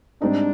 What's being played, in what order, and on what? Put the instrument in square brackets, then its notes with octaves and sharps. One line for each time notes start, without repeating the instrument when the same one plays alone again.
[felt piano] G#2 G3 C4 D#4 [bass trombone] D4